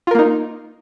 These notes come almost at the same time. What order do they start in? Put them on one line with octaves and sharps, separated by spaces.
F4 A#4 A#3 D#4